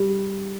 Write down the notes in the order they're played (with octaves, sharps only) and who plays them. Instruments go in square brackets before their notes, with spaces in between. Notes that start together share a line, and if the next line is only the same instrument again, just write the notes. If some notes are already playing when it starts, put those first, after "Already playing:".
Already playing: [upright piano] G3